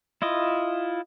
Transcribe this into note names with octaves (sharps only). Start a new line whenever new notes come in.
E4 F4 D#5